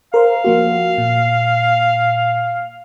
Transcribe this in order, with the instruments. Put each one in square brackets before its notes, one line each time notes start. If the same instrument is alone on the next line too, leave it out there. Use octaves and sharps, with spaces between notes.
[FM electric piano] A#4 C5 [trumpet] F5
[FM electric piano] F3 A#3 F#4
A#2